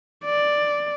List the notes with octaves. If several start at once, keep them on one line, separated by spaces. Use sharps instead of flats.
D5